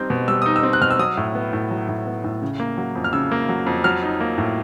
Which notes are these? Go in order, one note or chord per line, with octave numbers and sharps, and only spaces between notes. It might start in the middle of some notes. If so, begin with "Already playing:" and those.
Already playing: G3 C4 D#4 G6
B2
G3 E6
D#4 D#6
E6
C4
F#6
B2 F6
E6
F#3 D#6
A2
B3
A2
F#3
A2
B3
A2
C#3
A#3
F#3
F2
F6
C#3 E6
A#3
F#3
F2
F#3 F6
D#4
A#3
A2